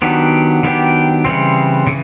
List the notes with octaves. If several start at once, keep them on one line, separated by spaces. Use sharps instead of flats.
D#3 F#3 B3 D4 G4
D#3 F#3 B3 D4 G4
C#3 E3 G3 C4
C#3 E3